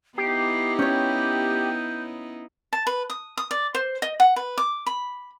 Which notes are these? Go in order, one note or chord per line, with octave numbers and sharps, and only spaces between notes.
B3 D#4 E4 G4 C7
C#4 C#5 G6
A5
B4
D#6
D#6
D5
C5
D#5
F#5
B4
D6
B5